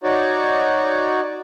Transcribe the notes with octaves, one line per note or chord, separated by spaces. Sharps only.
D#4 F#4 C#5 D5